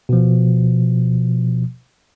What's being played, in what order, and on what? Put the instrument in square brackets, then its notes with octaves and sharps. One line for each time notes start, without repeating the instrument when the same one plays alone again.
[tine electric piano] B2 F3